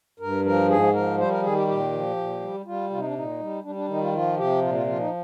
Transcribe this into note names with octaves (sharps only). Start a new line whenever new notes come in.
G2 A#4
F3 A#4
G#2 G#4
F3 A#4
G3 C5
A#4
D#3 G#4
G4
A#2 G4
F3
A#2
G3
G3 F4
C3 F4
D#4
D4
A#2 D#4
G3
G3 D4
D4
D#3 D#4
F4
F3 F4
C3 G4
A#2 F4
F4
F3 F4
D#4